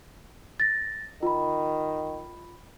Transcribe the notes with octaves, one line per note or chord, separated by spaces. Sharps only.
A6 A#6
D#3 F4 B5